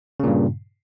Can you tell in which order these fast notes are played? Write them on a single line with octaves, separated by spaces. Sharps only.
C#3 A#2 G2